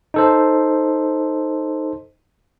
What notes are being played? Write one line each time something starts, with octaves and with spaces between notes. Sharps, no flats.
D#4 A4 C5